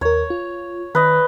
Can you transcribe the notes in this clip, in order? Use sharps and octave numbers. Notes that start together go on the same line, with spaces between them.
D#2 A#4 C#5
F4
D#3 B4 D#5